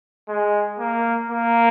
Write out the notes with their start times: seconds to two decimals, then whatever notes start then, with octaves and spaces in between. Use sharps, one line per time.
0.28 G#3
0.79 A#3
1.30 A#3